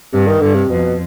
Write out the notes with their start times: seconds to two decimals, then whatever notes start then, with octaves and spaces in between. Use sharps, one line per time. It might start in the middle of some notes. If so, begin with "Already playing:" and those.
0.13 G2 C3
0.27 D#3
0.41 G2 D3
0.55 C3
0.70 F2 B2